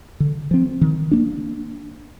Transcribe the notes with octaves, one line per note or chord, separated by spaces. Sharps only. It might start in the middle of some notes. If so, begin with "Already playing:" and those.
D3
F3 C4
D#3
A#3 D4